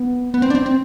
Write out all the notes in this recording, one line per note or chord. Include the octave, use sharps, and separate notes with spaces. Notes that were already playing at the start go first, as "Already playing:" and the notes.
Already playing: B3
B3
C4
D4
C4
C4